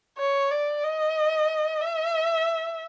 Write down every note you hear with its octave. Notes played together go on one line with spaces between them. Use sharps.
C#5
D5
D#5
E5